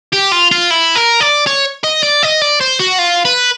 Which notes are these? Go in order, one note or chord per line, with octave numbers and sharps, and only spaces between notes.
G4
F4
F4
E4
A#4
D5
C#5
D#5
D5
D#5
D5
C5
F#4
F4
B4